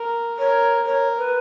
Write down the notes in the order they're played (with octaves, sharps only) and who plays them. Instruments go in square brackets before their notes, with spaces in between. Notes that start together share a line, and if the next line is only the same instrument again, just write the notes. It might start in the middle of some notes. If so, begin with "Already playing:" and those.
Already playing: [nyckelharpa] A#4
[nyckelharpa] A#4 [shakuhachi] C#5
[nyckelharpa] A#4 [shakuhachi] C#5
[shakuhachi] B4